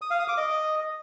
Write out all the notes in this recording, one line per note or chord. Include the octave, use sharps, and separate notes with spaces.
D#6
F5
D#6
D6
D#5